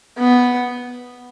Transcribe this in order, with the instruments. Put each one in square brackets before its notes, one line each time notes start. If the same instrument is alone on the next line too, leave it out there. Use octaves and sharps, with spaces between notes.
[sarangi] B3